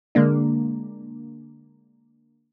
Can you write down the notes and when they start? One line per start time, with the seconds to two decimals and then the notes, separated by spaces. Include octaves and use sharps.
0.15 D3 G#3 A#3 D4